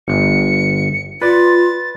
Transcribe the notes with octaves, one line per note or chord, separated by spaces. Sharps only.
G1 C#7
F4 B4 D5 A6